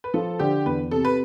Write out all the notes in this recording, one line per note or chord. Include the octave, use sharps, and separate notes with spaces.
B4
F3 A4
D3 G4
E2 B4
C3 A4
B4